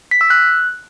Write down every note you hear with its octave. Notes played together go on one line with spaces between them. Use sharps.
B6
E6
F#6